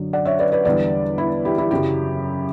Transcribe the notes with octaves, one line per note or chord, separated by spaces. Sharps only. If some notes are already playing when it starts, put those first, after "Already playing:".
Already playing: F#2 D3 F#3
D5 F#5
C#5 E5
B4 D5
B4 D5
E2 D3 G3 B4 D5
E4
E4 G4
E4 G4
F#2 C#3 F#3 E4 G4